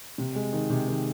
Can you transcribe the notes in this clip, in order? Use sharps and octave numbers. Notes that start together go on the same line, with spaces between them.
C3
G#3
D#3
C3
D#3